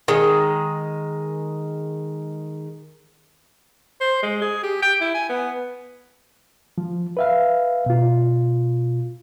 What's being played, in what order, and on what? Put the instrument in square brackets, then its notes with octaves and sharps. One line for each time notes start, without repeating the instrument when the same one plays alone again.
[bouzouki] D#3 G#3
[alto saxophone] C5
G#3
G#4
G4
G5
E4
G#5
B3
[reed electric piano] F3
B4 E5 F5
B2 F4